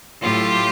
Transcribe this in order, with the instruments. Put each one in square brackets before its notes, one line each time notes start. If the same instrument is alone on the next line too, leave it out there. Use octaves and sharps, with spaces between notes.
[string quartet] A2 F#3 F4 G4